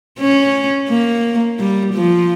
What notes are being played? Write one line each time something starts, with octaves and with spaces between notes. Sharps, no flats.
C#4
A#3
G3
F3